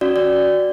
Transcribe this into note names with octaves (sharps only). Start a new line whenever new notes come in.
C#4 F#4 D5
D5